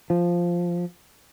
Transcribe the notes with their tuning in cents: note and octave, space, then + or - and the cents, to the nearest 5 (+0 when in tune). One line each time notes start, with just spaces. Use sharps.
F3 +0